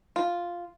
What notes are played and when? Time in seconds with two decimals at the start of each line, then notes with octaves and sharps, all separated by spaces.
0.16 F4